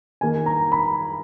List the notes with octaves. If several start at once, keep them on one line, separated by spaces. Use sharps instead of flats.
D#3 A#3 G#5
A#5
B5